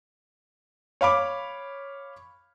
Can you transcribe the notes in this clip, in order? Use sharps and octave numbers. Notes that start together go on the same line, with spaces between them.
C#5 F5 B5 D6